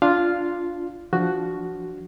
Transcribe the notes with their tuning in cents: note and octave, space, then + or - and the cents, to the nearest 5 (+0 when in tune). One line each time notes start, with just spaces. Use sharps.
D4 +0 F4 +0 F5 +0
F3 +0 D4 +0 F#4 +5